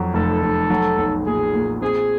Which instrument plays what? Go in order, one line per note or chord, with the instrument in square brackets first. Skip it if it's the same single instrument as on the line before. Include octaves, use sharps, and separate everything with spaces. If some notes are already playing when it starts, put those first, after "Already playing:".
Already playing: [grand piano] F2 F#3
[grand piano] F1 [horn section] A4
[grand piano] F1
F#3
B1
[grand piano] A#2 [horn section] G#4
[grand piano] A#2
[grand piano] C4 [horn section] G#4